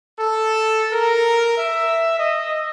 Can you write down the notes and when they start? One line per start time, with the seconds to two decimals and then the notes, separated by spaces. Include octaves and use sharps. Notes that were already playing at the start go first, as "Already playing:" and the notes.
0.18 A4
0.91 A#4
1.57 E5
2.18 D#5